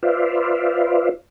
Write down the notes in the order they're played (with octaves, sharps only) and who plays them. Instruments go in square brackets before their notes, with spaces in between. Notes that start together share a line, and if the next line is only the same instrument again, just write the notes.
[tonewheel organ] F4 B4 C5 D5 E5 F5